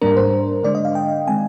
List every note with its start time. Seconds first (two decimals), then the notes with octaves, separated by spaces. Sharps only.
0.02 G#2 G3 A#3 D4 A#4
0.17 C5
0.63 D3 G#3 D4 D5
0.75 D#5
0.85 F5
0.95 G5
1.27 D#3 G#3 C4 G#5